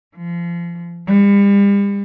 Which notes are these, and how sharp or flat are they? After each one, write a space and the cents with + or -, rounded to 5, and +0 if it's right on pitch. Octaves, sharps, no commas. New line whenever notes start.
F3 -25
G3 +40